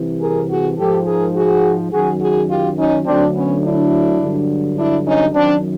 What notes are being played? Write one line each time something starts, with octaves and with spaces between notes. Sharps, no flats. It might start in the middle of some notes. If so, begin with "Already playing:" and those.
Already playing: C2 C3 E3
G#4 A#4
F#4 G#4
G#2 F3 G4 A4
G#4 A#4
F#4 G#4
F#2 D#3 F#3 F#4 G#4
F#4 G#4
F4 G4
C#4 D#4
D2 D3 F#3 C4 D4
B3 C#4
D4 E4
G2 D3 F#3
D4 E4
C#4 D#4
F#2 D#3 F#3 C4 D4